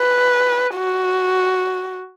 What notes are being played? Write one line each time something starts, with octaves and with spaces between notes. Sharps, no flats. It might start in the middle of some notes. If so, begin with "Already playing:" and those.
Already playing: B4
F#4